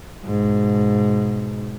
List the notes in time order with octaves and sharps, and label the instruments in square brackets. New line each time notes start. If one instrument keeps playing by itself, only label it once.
[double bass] G#2 B2